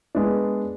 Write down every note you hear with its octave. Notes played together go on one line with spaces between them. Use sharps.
G#3 B3 D4